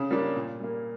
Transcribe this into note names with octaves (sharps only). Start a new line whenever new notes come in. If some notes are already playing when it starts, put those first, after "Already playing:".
Already playing: C#3
G3 A#3 D4
A#2
G3 A#3